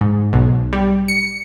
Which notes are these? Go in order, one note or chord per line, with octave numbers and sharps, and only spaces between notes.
G#2
B1
G3
C#7